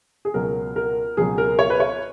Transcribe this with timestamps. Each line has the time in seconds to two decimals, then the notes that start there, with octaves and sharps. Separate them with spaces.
0.25 G#4
0.34 C#2 B2 F#3 A#4
0.76 A#4
1.17 C#2 B2 F#3 G#4
1.38 A#4
1.59 C#5
1.70 B4
1.80 C#5